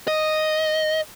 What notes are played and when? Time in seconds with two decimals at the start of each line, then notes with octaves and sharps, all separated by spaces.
0.08 D#5